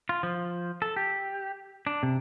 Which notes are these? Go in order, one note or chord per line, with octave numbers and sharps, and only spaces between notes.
F4
F3
A4
G4
D4
C3